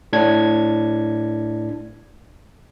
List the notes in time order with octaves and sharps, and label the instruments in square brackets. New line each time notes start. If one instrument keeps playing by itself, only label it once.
[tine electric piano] A2 D4 G#6